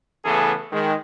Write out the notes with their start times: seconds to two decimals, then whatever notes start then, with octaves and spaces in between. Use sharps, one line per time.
0.25 C#3 E3 A3 B3 G#4 A4
0.72 D#3 G#3